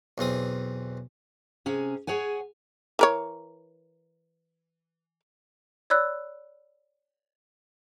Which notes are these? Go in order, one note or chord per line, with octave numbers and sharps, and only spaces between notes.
B1 E2 C4 D#6
C3 C#4 G#4
G#4 C#5 F#5 G#5
E3 A#4 C#5
C#5 D5 B5 E6 F#6